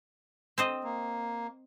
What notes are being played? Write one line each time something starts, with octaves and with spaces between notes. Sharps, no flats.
C4 C5 D#5
A#3